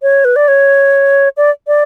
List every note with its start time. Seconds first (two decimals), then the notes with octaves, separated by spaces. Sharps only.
0.02 C#5
0.25 B4
0.36 D5
0.48 C#5
1.37 D5
1.67 D5